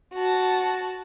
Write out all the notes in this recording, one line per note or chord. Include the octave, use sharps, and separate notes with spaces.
F#4 A5